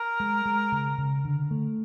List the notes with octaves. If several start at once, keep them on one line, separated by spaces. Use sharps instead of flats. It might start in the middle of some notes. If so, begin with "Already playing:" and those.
Already playing: A#4
G#3
G#3
C#3
C#3
D3
A3